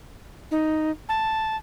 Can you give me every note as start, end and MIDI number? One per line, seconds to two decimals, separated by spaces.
0.51 0.91 63
1.09 1.56 81